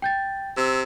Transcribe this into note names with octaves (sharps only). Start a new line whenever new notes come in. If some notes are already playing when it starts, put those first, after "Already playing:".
G5 G6 A6
C3 E6